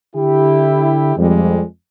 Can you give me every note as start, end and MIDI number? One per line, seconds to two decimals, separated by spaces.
0.15 1.14 50
0.15 1.14 64
0.15 1.14 67
1.17 1.62 41
1.17 1.62 55
1.17 1.62 56